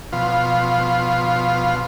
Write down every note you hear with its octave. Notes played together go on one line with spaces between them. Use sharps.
B2 F3 F4